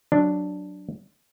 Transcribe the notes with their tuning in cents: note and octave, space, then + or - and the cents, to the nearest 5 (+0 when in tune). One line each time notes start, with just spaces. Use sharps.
F#3 +0 D4 +0